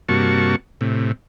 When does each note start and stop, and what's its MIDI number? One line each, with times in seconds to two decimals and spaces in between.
0.09 0.56 43
0.09 0.56 48
0.09 0.56 58
0.09 0.56 66
0.09 0.56 81
0.09 0.56 85
0.81 1.12 45
0.81 1.12 48